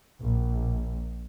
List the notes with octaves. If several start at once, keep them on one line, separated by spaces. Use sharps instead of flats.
A#1